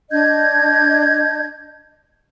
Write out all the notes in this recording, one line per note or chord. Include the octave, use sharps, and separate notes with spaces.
D4 D#5 G6 G#6